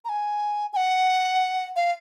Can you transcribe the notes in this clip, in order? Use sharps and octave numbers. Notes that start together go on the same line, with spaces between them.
A#5
G#5
G#5
F#5
F5